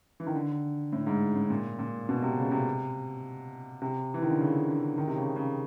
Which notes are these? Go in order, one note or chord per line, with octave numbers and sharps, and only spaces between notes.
E3
D#3
D3
A2
G#2
A2
A#2
A#2
B2
C3
C#3
C3
C3
E3
D#3
D3
C#3
D3
D#3
C3
C#3
C#3